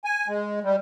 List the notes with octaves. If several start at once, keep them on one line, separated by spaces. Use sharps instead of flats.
G#5
G#3
G3